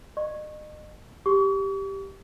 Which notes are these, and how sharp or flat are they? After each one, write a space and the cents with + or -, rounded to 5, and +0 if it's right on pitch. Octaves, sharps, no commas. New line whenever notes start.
D#5 -35 C#6 -20
G4 +0 C#6 +45